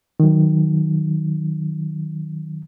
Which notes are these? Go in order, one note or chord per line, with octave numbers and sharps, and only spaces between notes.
D#3 F#3